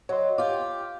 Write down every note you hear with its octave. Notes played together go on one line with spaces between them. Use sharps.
F#3 C#5 D#5 C6
F4 G4 D6